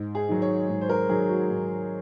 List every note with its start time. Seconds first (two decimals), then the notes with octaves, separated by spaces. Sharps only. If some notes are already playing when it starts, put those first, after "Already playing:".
Already playing: G#2
0.15 G#4
0.29 D#3 F#3
0.42 C#5
0.69 G#2
0.81 C5
0.89 A#4
1.09 D#3 F#3 G#4
1.29 F#4
1.50 G#2